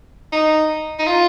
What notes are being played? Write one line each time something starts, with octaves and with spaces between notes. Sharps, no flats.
D#4
D#4
F4